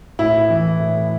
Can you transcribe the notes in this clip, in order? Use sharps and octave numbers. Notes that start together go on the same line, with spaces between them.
A2 E4
E3
A2